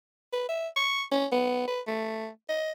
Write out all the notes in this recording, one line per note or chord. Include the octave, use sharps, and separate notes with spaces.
B4
E5
C#6
C#4
B3
B4
A3
D#5